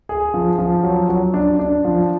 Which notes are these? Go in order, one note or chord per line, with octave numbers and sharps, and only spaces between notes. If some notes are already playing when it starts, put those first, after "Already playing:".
G#4
F3
F3
F#3
F#3
D4
D4
F3